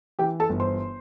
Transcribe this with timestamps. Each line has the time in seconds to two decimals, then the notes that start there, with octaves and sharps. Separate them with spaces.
0.19 E3 G4 G5
0.40 A4 A5
0.50 G1
0.60 C5 C6